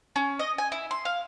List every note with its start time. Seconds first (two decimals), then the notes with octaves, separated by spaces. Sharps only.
0.16 C#4
0.39 D#5
0.58 G#5
0.72 E4
0.91 C6
1.05 F5